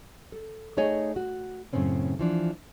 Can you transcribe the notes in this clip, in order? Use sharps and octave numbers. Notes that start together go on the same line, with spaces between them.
A4
A3 D#4 G#4 C#5 D#5 G#5
F#4
F#2 A2 C#3 C4 C#4
E3 F3 D4